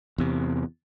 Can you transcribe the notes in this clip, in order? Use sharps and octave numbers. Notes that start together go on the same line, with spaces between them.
E2 C3